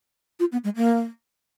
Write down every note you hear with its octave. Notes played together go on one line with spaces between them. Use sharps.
F4
B3
G#3
A#3